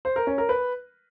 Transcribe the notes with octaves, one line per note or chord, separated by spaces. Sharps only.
C5
A#4
C#4
A#4
B4